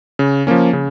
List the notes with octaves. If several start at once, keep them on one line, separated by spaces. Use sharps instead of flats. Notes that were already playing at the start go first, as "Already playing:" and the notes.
C#3
F3 A#3 C#4
C#3